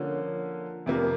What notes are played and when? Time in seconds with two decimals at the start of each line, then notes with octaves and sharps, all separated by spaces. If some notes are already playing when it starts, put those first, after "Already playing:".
Already playing: D3 F3 A#3 C#4
0.86 F2 C3 F3 A#3